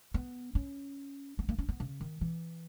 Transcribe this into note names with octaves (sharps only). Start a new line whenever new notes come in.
B3
C#4
B3
A#3
C#4
B3
C#3
D#3
E3